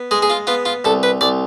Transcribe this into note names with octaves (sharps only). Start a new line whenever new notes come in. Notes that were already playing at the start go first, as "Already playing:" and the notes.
Already playing: B3
G#3 G#4
G#4
F4
B3 F4
F4
C2 A4
B4
C2 D5